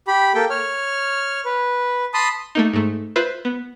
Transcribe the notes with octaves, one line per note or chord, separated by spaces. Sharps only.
G4 B5
A#3 A4 G5
C#5 F6
B4
A5 B5 C6 D#6
A3 A#3 D#4
G#2 A3
F4 B4 C5 E5
B3